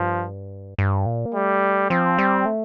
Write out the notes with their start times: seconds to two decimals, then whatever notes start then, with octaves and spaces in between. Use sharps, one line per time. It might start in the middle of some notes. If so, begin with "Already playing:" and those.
Already playing: G2 F3
0.78 G2
1.06 A#2
1.25 A#3
1.34 G3 A3
1.90 F3 C4
2.18 G3
2.46 A3